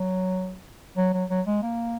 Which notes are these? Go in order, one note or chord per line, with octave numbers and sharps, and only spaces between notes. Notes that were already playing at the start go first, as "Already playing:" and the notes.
Already playing: F#3
F#3
F#3
F#3
G#3
A#3